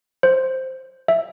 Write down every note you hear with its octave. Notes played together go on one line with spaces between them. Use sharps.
C5
E5